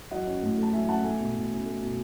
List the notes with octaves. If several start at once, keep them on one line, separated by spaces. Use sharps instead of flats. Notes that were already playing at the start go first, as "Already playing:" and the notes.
F#3 D#5 F#5
C#4
A2
A3 A5
F#3 E5 G#5
C#4 F#5 A5
A3 E5 G#5
B2
B2
C#4
A3
B2